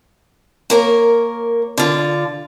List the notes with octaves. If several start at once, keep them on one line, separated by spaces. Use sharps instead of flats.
A#3 A#4 C#5
D3 F4